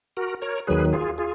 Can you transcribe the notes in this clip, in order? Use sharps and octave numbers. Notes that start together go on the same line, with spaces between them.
F#4 A#4
A#4 C#5
D#2 D#3 F#3 G#4 B4
F4 G#4
F4 G#4